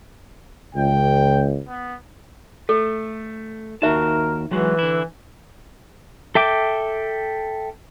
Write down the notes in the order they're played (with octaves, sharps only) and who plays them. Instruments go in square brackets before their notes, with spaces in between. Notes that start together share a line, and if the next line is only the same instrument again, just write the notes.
[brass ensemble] C#2 [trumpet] G5
[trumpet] B3
[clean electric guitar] A3 [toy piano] A4
[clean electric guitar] D#2 F#4 A5 [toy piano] D#4 G4 E5 [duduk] A#4
[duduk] E3 [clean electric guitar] F#3 G#3 F#4
[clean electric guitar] D3 E4
[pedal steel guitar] A4 E5 G5 D6